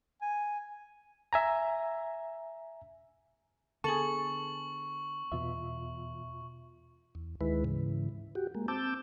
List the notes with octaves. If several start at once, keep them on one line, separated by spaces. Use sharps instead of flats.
G#5
E5 G#5 A#5
D3 B3 G#4 A4 C#6 F#7
E2 B2 F4 E5
E2
D2 D#3 G#3 E4 B4
G#2 C#3 E3
F#4 G4
G#3 A#3
C4 A5 D6 E6 G6